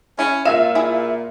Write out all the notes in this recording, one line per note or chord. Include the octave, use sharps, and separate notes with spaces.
C#4 E4
A#2 F4 E5 F5 E7
E4 G#4